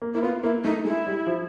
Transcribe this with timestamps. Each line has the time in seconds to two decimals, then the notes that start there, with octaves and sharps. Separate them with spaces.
0.02 A#3
0.14 A#3 E4
0.22 B3 F4
0.43 A#3 E4
0.64 A3 D#4
0.85 G#3 E4
1.07 G3
1.27 F3